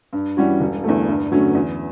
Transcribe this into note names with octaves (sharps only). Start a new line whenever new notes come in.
G2
E3 G3 C#4 F#4
E1
E2 D3 A3
G2
D3 F#3 A3 C#4
E2